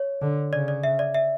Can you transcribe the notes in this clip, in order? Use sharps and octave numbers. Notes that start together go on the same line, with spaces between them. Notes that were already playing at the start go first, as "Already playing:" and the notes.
Already playing: C#5
D3
C#3 D5
D5
E5
D5
E5